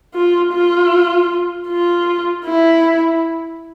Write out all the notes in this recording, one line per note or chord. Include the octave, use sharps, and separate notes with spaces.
F4
F4
F4
E4